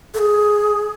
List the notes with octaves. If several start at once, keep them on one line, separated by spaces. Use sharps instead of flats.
A4
G#4